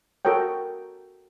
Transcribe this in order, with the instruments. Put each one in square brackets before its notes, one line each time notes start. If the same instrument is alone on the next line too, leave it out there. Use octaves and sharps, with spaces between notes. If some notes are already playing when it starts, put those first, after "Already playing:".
[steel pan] F#4 A4 A#4 C#5 G5